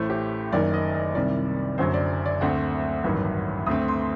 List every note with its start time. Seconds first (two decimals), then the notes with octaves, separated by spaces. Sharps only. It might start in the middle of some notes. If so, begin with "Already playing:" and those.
Already playing: A1 A2 A3 C5
0.10 G4
0.52 F#1 F#2 D#3 D5
0.74 D#5
0.95 D#5
1.15 C2 C3 D#3 G3 D5
1.78 F#1 F#2 D3 F#3 C5
1.94 D5
2.26 D5
2.41 D2 D3 A3 C4 F#5
3.04 A1 G2 D#3 F#3
3.66 D2 D3 A3 C4 D#6
3.88 C6